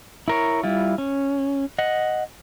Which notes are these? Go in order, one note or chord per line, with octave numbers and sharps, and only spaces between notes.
E4 A#4 C#5
G3 E4 F4
C#4
D#5 F#5